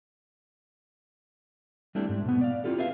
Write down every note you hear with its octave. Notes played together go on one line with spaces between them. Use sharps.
G3 A3 C4 D4 E4 G4
G#2
B2 B3
D5 F5
C4 E4 F4 G4 A4
G#4 B4 E5 F5